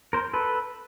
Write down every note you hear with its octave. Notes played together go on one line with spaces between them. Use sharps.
A#4 C5
A4 B4